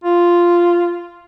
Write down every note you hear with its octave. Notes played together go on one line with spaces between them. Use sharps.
F4